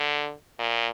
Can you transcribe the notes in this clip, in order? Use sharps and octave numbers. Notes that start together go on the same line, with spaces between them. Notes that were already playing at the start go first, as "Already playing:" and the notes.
Already playing: D3
A#2